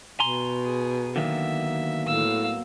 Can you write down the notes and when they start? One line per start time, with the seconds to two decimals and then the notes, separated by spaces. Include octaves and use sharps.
0.20 B2 G#5 A#5 C6
0.64 G#4
1.16 D3 D#3 F#3 A#3 B3 E5
2.07 A2 F5 E6